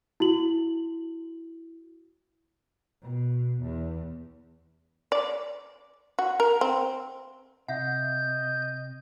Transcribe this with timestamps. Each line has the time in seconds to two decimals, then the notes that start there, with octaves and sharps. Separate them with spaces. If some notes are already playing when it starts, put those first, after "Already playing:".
0.20 E4 F#4 F#7
3.02 B2
3.62 E2
5.12 D5
6.19 F#4
6.40 A#4
6.61 C4
7.68 C3 D#5 E5 F#5 G6